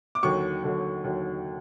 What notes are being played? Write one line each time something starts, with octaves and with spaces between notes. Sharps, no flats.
D6
D#2 D3 F#3 C#6
D#2 D3 F#3
D#2 D3 F#3